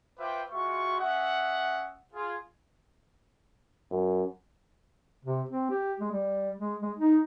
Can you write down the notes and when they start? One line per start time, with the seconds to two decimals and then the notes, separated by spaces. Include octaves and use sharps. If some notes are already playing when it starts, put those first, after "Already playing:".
0.19 F4 B4 C5 E5 G5 D6
0.51 G#3 F4 F#4 E5 C#6
1.00 C#4 D#5 E5 F#5
2.14 F4 G#4
3.91 F#2
5.25 C3
5.49 C4
5.70 G4
6.00 G#3
6.12 G3
6.59 G#3
6.82 G#3
6.98 D#4